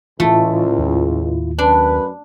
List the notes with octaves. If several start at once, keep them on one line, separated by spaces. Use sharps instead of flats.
C#2 A2 E3 A3 C#4 E4 F4
D#2
F#2 D4 B4